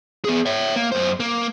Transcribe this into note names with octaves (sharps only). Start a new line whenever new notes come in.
B3 G#4
C#5 E5
A#3
F#2 C5
A#3